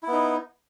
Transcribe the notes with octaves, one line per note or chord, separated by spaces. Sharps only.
B3 D#4 E4